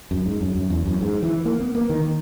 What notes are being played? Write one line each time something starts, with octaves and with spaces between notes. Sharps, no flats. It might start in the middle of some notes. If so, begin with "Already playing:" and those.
F#2
G#2
F#2
F#2
E2
F#2
G#2
E3
A#3
B3
A#3
D#3